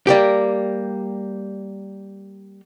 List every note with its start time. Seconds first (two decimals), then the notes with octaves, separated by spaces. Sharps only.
0.07 G3 A#3 G4